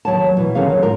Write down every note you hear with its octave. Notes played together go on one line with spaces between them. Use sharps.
D#2 F#3 C#5 A5
B2 E3
D3 D#3 F#3 C#4 G#4 F5
F2
G#2 F4 A#4